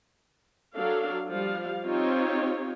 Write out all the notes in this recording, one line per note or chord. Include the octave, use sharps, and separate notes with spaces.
F#3 D4 A4 F5
F3 G3 F5
C4 D#4 F4 G4 C#5